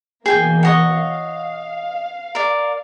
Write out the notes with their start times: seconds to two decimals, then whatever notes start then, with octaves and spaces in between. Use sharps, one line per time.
0.26 B2 E3 A#3 G#4 G5 G#5
0.63 C#5 D#5 F#5
0.94 F5
2.35 A#4 D5